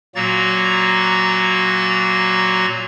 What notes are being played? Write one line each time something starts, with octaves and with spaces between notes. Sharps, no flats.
A#2 F#3 A#3 F#4 A#5 A6